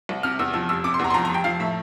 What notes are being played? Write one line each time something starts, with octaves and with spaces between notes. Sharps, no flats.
C2
C3 F6
E2 E6
F3 E6
F1 E6
C3 D6
C6
E2 A#5
C6
F3 A#5
A#5
F1 G5
F3 F5
A2 E5